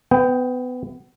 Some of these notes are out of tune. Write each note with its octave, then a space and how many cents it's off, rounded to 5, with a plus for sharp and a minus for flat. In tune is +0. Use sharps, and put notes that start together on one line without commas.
B3 +25 G5 +0